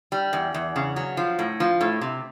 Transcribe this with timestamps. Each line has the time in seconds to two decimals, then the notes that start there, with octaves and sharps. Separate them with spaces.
0.12 G3
0.33 E2
0.54 E2
0.76 C#3
0.96 F#3
1.17 F3
1.39 A2
1.60 F3
1.81 A2
2.01 C3